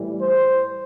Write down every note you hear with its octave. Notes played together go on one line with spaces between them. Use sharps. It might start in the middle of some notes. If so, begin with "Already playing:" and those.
Already playing: A2 E3 G3
C5